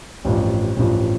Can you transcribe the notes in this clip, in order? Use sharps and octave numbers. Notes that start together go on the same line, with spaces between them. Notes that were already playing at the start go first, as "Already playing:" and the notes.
A1 G2 F3
A1 G2 F3